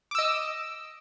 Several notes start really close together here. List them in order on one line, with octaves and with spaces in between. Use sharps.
D6 E6 D#5